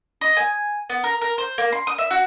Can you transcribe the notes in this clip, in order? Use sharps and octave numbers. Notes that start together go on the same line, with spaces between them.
D#5
G#5
B3
A#4
A#4
C5
A#3
C6
D#6
E5
F#4